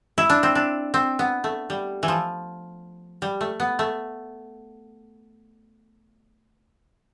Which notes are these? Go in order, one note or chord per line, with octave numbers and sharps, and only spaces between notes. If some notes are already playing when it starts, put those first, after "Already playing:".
E4
D4
C4
D4
C4
B3
A3
G3
E3
F3
G3
A3
B3
A3